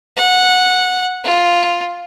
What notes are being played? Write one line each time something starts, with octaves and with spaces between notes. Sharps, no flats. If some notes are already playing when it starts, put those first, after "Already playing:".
F#5
F4